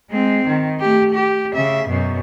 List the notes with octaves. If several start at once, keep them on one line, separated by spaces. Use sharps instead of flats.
G#3 C4
D#3
A3 G4
G4
C#3 E5
F#2 B2